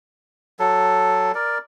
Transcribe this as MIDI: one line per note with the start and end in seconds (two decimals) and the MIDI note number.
0.59 1.32 54
0.59 1.32 69
1.35 1.58 70
1.35 1.58 74